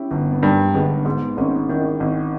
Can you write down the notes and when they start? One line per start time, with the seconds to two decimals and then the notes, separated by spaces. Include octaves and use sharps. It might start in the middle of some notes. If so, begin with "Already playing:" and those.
Already playing: C#4 E4 G4
0.11 G1
0.32 B3
0.43 G2 G3 A#3
0.74 G1 G#3 B3
1.05 G#2 G#3 B3
1.37 G#1 A#3 C#4
1.69 D#3 C#4 E4
2.00 G#1